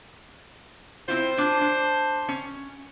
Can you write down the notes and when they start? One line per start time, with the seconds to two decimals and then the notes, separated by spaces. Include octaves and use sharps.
1.08 C4 E4 F4 C5
1.37 D4 F4
1.61 D4
2.28 C#4